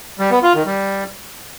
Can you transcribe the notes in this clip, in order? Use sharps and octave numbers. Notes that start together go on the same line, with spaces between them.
G3
B3
F4
D#3
G3